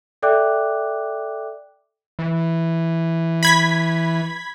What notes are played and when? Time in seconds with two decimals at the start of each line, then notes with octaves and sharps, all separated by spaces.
0.22 A4 D5 E5 G5 D6 F#6
2.19 E3
3.43 B5 G#6 B6